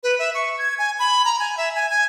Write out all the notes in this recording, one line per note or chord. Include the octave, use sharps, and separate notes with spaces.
B4
E5
C#6
G#6
G#5
B5
A#5
G#5
E5
G#5
G#5